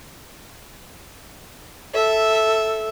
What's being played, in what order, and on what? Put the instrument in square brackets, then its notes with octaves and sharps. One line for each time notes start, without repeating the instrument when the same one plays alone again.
[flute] A4 [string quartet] E5